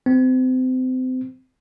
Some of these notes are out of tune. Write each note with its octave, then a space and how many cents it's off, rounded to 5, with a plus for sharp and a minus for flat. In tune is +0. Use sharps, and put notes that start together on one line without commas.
C4 -30